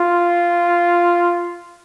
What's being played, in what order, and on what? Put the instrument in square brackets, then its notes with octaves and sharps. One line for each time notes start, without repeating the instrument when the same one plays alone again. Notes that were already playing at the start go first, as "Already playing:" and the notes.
Already playing: [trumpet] F4